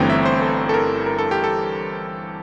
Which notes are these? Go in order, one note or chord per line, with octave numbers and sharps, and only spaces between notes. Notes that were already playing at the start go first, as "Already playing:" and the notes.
Already playing: G1 G2 E3 A3 C4 G5 A#5
E5
C5
A4
A4
A#4
A#4
A4
G4
A4